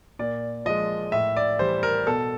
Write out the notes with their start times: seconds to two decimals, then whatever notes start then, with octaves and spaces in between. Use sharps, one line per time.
0.19 A#2 D5
0.65 F3 G#3 D#5
1.12 A2 E5
1.36 D5
1.59 E3 G3 C5
1.83 A#4
2.06 B2 A4